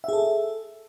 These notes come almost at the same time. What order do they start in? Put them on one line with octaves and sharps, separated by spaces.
E5 G#4 A4